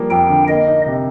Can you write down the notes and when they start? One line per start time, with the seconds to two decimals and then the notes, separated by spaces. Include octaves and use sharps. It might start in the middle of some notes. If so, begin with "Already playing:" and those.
Already playing: F3 G3 A#3
0.10 F2 G5
0.29 D3
0.48 A#3 D#5
0.67 D#4
0.86 C3